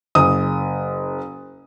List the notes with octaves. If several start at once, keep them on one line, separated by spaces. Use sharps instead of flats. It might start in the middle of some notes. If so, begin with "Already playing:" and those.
F#1 D#6